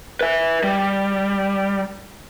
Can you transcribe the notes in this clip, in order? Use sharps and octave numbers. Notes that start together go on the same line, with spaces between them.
B4 E5
G3